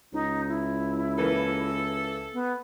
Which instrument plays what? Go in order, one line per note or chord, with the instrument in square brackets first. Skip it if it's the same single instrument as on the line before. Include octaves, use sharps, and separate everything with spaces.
[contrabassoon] C#2 [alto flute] D#4
[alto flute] E4
[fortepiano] E3 A#3 [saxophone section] A4
[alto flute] B3